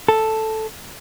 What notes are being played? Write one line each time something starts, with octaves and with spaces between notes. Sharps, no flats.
A4